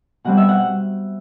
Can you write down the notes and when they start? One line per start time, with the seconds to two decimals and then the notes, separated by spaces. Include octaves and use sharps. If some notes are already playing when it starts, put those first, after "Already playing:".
0.24 B2 G3 C4 F#5
0.37 E5
0.49 F#5